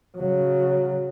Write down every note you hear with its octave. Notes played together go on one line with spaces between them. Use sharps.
C#3 F#3